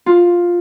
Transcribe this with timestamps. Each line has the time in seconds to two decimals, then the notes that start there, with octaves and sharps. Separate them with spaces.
0.06 F4